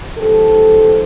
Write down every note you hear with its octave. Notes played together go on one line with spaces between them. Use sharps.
G#2 F3 G4 A4